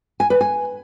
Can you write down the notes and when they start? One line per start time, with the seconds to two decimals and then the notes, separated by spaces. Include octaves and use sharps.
0.20 G#5
0.30 B4
0.41 G#5